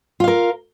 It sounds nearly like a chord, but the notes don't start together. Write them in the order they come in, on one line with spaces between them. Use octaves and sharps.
F4 F5 A#4